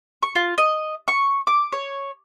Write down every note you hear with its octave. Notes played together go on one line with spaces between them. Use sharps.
C#6
F4
D#5
C#6
D6
C#5